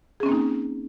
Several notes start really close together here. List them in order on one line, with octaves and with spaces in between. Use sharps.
G#4 C#4 C4 A#3 D#4